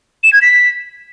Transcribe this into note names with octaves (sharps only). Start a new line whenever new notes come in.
E7
G#6
B6